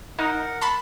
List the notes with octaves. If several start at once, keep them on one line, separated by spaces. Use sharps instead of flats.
D#4 A#4 F#5
A5 B5